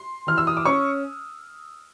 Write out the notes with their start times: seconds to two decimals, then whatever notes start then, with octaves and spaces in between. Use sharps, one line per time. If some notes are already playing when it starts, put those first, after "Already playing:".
Already playing: C6
0.27 E3 F6
0.38 E6
0.47 D#6
0.57 D6
0.65 C#4 C#6